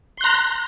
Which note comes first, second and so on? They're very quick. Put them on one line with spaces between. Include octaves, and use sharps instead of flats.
C6 F#6 A#5